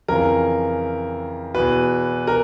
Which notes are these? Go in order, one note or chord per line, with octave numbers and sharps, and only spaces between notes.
F2 C#3 E3 A#4
E2 B2 B4
A#4